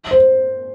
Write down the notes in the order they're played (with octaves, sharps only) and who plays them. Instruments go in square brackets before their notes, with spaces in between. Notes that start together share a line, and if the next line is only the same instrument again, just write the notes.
[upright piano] C5